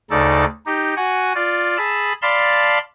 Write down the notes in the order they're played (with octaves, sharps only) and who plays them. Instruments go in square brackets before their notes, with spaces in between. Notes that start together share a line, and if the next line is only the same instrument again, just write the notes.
[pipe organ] D2 C#3 D#4 A4 D5 A6
D#4 G4
F#4 F#5 G#5
F4 D5
G#4 A5 B5 E6
D5 F5 A5 B5 C6